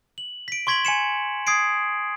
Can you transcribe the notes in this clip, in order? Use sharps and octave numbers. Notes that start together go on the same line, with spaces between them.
F#7
B6 D7
C6 C#6 G#6 B6 D7 F#7
G#5 G#6 C#7 E7
D#6 G#6 C7 D7